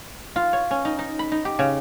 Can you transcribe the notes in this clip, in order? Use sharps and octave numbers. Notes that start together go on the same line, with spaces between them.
F4
C#5
C#4
D#4
D#4
B5
D#4
G4
C#3